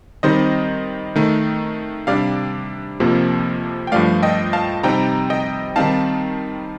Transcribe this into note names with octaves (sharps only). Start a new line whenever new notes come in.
D#3 G3 C4 D#4 C5 D#5
D#3 A3 D#4
C3 G3 D4 D5 F5
F2 C3 F3 A#3
G5
G2 F3 A3 D5 F5
D#5 G5
F5 A5
C3 G3 C4 D#4 G5 A#5
D#5 G5
D#3 G3 C4 D#4 F5 A5